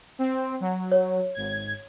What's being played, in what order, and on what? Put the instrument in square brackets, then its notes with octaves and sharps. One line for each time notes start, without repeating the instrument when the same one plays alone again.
[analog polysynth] C4
F#3
[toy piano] C#5
[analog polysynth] G#1 G#6